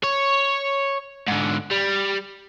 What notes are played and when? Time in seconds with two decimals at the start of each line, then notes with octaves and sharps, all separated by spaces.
0.04 C#5
1.28 G#2 D3
1.71 G3